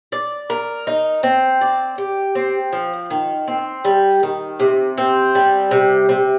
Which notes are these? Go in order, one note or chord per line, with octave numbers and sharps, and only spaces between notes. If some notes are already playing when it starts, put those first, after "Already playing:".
D5
A#4
D#4
C4
D5
G4
C4
F3
D#3
C4
G3
D#3
C3
C4
G3
C3
C3